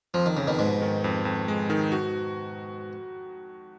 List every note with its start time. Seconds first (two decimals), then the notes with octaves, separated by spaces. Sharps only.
0.14 F2 F3
0.26 D#3
0.37 F2 C#3
0.47 B2 D#3
0.59 G#2 B2 G#3
0.82 D#3
1.04 F2
1.25 F2
1.48 G#3
1.70 D#3
1.92 F#4